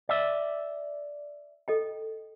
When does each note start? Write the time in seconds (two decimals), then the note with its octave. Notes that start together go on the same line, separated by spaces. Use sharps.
0.09 D5 E5
1.68 A4 D#5 G5